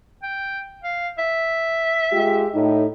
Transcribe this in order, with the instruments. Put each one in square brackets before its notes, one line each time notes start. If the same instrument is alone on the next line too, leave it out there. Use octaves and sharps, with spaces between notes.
[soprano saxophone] G5
F5
E5
[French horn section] G#3 F4 G4
A2 D#4